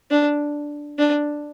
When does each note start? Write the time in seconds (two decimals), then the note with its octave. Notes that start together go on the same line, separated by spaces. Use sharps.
0.11 D4
0.98 D4